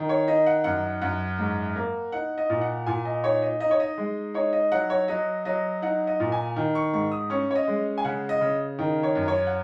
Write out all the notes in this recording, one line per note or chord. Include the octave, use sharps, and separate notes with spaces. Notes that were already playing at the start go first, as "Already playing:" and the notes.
Already playing: D#3
C#5
D#4 D#5
F#5
F#2 F#5
F#2 F#5
G#2
A#3
D#4 F#5
D#5
A#2
F#5
A#2 G#5
D#5
D#4 C#5
D#5
D#4 D#5
C#5
D#5
G#3
D#4 C#5
D#5
F#3 F#5
C#5
F#3 D#5
F#3 D#5
D#4 F#5
D#5
A#2
G#5
D#3
C#6
G#2 C#6
D#6
C#4 C#6
C#5
D#5
G#3
G#5
C#3 F#5
D#5
C#3
D#3
C#5
F#2
C#5
F#5